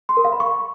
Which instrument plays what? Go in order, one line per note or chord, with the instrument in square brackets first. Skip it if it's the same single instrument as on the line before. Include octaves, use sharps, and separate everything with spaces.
[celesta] C6
A#4
F5
B5
C#6